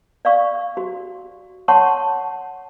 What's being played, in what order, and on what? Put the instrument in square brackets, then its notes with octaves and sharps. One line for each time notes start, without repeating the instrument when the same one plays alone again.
[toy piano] D5 F5 C#6
F#4
C#5 F#5 A5 C6 C#6